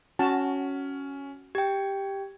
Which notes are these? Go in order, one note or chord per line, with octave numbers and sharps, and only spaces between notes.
C#4 F#4 A5
G4 G5 G#6